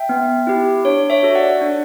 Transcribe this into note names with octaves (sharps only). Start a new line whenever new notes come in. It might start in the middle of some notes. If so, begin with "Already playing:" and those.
Already playing: E5 G5
B3
E4 G4
D4 C#5
C#5 E5
F#4 A4
D5 F#5
D4